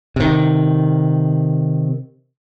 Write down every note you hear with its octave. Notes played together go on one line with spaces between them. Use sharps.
C3 D#3